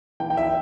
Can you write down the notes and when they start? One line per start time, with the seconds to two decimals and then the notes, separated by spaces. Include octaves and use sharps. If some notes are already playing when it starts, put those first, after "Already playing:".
0.20 E3 G5
0.30 G5
0.37 E5